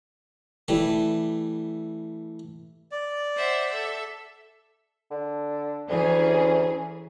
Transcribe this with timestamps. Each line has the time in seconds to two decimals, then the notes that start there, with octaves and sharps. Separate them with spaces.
0.68 E3 G3 A3
2.92 D5
3.35 C5 E5 F#5
3.70 A4 E5
5.11 D3
5.90 D2 E3 C#4 G#4